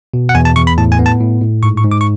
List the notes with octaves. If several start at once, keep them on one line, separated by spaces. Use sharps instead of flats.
B2
F#5
E2 G#5
A5
E2 C#6
B5
A2 A5
G#5
B3
A5
A2
A2
G#2 C#6
C#6
G#2
D6
C#6